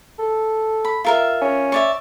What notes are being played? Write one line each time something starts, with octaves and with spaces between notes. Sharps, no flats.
A4
B5
F4 A#4 E5
C#4
C#5 D5 E5